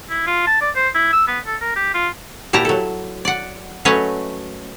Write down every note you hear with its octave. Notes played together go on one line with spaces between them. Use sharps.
E4
F4
A5
D5
C5
E4
E6
B3
A4
A#4
G4
F4
A#2 E4 G4 A5 A#5
F#3 A4
D5 F#5
F#3 A3 C#4 B4 C#5 D#5